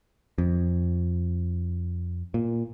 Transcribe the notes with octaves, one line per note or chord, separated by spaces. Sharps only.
F2
A#2